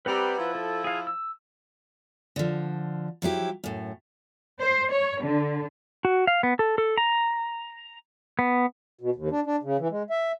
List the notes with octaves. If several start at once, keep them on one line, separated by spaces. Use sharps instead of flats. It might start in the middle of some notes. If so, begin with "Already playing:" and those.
G3 C4 B4 F#5 A#5
F3 E4
A4
G#4 F5
E6
D3 F3
F3 F#3 E4 G4
F#2 A2
C5
C#5
D3
F#4
F5
B3
A4
A4
A#5
B3
B2
D#2
D4
D4
C#3
E3
G#3
E5